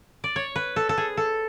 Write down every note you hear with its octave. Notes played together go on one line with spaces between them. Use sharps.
D5
C#5
B4
A4
A4
G#4
A4